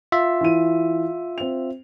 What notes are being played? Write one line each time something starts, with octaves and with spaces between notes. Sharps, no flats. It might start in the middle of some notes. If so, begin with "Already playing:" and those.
F4 E5
E3 D#7
C4 F7